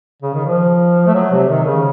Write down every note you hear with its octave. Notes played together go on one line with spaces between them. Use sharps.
C#3
D#3
F3
A3
F#3
C3
D#3
C#3